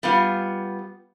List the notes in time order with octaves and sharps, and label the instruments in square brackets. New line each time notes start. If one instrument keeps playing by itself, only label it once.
[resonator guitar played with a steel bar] G3 B3 F4